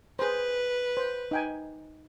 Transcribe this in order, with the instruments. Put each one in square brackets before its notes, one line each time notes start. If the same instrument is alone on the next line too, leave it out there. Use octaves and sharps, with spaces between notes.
[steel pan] G#4 C5 [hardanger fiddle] B4
[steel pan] C5
D#4 G5 G#5